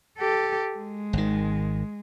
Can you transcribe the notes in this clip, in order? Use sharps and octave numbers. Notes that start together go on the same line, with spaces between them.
G4 A4
G#3
G#1 D#3